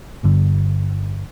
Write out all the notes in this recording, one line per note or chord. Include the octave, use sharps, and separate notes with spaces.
G1 G2 D3